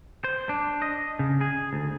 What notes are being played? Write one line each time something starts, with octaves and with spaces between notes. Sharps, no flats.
C5
D4
D#5
C#3
G#4
D2